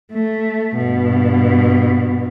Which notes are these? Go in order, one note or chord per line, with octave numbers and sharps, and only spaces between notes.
A3
G2 B2